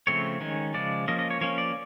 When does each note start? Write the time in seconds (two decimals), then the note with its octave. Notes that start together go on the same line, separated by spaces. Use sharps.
0.07 C#3 F3 A3 C4 C#5
0.40 D#3 G#3 C#4
0.74 C#3 F3 G#3 D5
1.08 F3 A#3 C#4 D#5
1.19 D#5
1.30 C#5
1.41 F3 A#3 C#4 C#5
1.58 D5